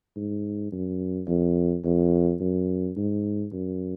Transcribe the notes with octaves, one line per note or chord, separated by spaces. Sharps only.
G#2
F#2
F2
F2
F#2
G#2
F#2